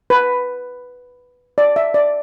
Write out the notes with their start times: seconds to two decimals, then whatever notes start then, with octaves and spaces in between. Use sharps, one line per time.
0.10 B4
1.58 D5
1.76 E5
1.94 D5